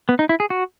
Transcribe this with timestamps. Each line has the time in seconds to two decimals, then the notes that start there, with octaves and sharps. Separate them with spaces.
0.09 B3
0.19 D#4
0.29 E4
0.40 G#4
0.50 F#4